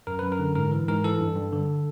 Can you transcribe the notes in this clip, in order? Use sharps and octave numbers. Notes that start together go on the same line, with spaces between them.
F#2 A#4
F#2 B4
A#4
D3
G#2 A#4
E3
G#2 A#4
E3 A4
G2
G2
D3